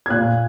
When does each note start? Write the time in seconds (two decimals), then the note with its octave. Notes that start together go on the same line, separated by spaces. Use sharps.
0.06 G#6
0.10 A#2 F#6